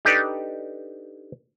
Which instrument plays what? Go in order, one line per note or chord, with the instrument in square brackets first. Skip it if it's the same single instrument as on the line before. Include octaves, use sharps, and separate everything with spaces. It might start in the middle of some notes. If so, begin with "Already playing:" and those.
[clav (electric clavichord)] D4 D#4 G4 A4 B4 D5